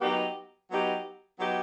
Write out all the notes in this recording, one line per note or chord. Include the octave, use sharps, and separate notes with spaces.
F#3 B3 D#4 G4
F#3 B3 D#4 G4
F#3 B3 D#4 G4